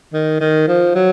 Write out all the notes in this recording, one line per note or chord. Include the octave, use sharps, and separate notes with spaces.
D#3
D#3
F3
F#3